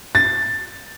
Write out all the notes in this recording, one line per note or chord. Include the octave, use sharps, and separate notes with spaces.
A6